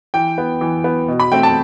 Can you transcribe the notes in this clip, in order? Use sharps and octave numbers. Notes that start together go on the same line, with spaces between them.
E3 G5
B3
E3
B3
B2
B5
A3 C4 G5
A5